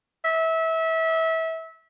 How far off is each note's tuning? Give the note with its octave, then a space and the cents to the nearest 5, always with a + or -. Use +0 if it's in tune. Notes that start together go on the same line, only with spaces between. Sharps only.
E5 -25